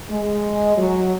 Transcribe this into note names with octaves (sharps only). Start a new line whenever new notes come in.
G#3
F#3